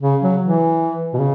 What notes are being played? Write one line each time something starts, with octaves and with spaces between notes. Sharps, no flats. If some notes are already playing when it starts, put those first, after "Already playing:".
C#3
F#3
E3
B2
C#3